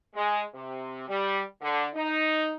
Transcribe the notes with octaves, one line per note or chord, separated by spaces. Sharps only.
G#3
C3
G3
D3
D#4